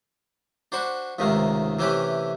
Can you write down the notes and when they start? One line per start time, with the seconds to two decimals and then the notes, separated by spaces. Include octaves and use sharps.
0.72 D4 F#4 C5 B5 C#6
1.19 C#2 G#2 C3 D#3 A3
1.79 C3 E3 A3 C#4 G4 B4